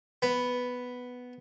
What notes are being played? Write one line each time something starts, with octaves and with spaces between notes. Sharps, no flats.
B3